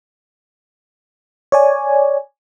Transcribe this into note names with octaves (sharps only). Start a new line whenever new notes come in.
C#5 D5 G#5